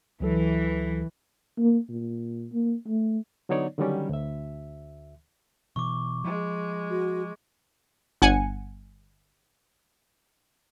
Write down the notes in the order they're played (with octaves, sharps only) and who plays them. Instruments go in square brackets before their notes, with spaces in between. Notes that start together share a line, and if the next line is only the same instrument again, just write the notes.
[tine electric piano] C#2 F#3 A4 [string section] E3
[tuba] A#3
A#2
A#3
A3
[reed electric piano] D3 F#3 B3 D#4 C#5 D5
D3 D#3 F#3 G3 C#4
D2 E5
[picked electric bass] B2 E3 [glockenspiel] C#6 D6
[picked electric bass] F3 [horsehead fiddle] G#3
[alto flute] F#4
[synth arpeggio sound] G1 F#5 G#5 C#7